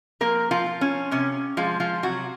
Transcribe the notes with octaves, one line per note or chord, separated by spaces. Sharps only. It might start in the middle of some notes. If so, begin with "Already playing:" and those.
F3 A#3 A#4
F3 F4
F3
C#4
C3 C#4
F3 G#3 F4
F3 F4
C3 F#3 F#4